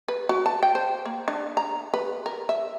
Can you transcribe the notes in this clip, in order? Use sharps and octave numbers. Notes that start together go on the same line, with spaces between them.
B4
F#4
A5
G5
C5
A#3
D4
A#5
B4
A#4
E5